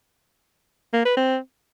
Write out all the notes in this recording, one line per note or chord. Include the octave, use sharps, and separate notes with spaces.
A#3
B4
C4